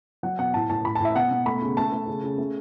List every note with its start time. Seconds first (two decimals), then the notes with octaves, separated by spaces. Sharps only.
0.23 F#3 F#5
0.39 B2 F#5
0.54 A2 A5
0.70 A2 A5
0.85 A2 B5
0.95 A5
1.00 A2 E5
1.16 B2 F#5
1.31 B2
1.46 A3 B5
1.62 C#3
1.77 A3 A5
1.92 A3
2.07 C#3
2.23 C#3
2.38 A3